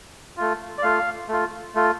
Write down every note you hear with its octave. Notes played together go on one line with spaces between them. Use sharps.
A3 F4
D5
A3 F4 F5
A3 F4
A3 F4